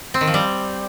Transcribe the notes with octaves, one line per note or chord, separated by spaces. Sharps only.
C4
D#3
F3
G3